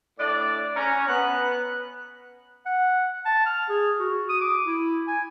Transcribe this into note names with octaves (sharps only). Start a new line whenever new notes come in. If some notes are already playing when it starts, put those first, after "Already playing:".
A2 D4 D5
C#4 A#5
B3 F#6
F#5
A5
F6
G#4
F#4
D#6
D6
E4
G#5